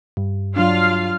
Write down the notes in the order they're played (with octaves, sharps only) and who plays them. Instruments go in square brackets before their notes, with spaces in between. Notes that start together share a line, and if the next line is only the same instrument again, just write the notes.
[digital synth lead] G2
[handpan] F#3 D4 [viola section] F4 F5